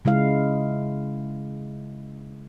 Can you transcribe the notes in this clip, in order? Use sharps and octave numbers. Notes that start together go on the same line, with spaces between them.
C#3 G#3 E4 F5